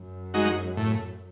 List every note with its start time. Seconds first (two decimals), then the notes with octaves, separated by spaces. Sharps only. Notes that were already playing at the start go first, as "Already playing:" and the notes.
Already playing: F#2
0.34 G#3 D#4 F#4
0.77 A2